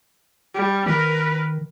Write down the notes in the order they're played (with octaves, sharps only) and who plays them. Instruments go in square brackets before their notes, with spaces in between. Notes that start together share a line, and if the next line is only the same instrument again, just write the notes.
[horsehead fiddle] G3
[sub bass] D#3 [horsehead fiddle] A#4 B4